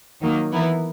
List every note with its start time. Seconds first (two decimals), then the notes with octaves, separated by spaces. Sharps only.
0.21 D#3 F#3 A#3 D#4
0.52 E3 B3 E4 A#4